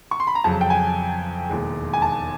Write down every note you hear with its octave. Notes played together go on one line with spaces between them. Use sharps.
C#6
C6
B5
A#5
F2 C#3 F#3 A5
G5
G#5
E1 D#2 D#3 G#3
G#5
A5